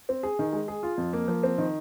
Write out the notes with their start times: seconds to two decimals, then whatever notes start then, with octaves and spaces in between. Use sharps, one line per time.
0.09 C4
0.23 G#4
0.39 D#3
0.53 G#3
0.68 G#4
0.83 F4
0.98 F2
1.13 A#3
1.28 F3
1.43 C4
1.58 D#3